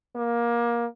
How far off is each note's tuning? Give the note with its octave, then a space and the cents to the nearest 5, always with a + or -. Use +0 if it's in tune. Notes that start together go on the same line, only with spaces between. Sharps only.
A#3 +20